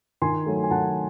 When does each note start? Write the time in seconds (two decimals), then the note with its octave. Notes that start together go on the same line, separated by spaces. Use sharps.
0.22 D#3 G#5 C6
0.46 F#3 A3
0.63 G#5
0.71 D#3 F#5 A5